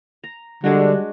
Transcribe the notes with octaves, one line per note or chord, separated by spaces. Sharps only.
A#5
D3 G3 G#3 D4 F#4